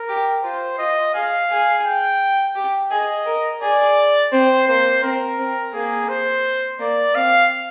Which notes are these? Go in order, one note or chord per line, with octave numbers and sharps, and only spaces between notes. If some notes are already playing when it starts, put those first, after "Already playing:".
Already playing: A#4
G4
F4 C5
F4 D#5
G#4 F5
G#4
G5
G4
G#4 D#5
A#4
G#4 D5
C4 C5
A#3 C5
C4 A#4
C4
A#3 G#4
C5
A#3 D5
C4 F5